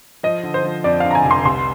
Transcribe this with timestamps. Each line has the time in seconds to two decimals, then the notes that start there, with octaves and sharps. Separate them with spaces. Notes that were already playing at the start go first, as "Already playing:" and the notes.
0.23 F3 D#5
0.43 D3
0.54 C5
0.64 F3
0.84 F2 D5
1.00 D3 F5
1.11 A#5
1.15 G#5
1.25 F1
1.31 C6
1.45 C2 C6